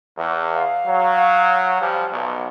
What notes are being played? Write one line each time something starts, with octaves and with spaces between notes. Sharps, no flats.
E2
F5
F#3
F3 G3
B1 B2